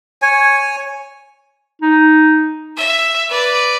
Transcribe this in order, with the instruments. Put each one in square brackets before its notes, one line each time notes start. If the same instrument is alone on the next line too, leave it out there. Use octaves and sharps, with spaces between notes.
[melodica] C#5 G#5
[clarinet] D#4
[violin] E5
B4 D5